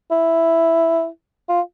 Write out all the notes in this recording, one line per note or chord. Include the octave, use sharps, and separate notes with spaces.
E4
F4